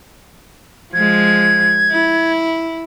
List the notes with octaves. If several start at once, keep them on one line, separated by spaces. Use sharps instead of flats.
F3 G#3 G#6
E4